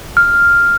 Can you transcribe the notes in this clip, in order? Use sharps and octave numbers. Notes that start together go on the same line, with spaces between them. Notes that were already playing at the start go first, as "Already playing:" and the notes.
F6